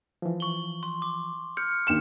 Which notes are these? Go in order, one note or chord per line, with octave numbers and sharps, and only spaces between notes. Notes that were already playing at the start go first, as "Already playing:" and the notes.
E3 F3
C#6 F#7 G7
C6
D6
F6 G6 C#7
D#2 E7